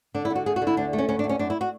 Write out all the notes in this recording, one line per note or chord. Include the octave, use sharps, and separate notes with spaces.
D3 D4
E4
D3
F#4
D2 G#4
F#4
D3
E4
D2 D4
A3
C#4
D2 C#4
D4
D2
C#4
F#2 D4
E4
F#4